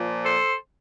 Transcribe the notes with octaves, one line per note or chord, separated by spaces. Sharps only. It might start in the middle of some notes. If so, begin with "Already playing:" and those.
Already playing: A#2 F3
A4 C5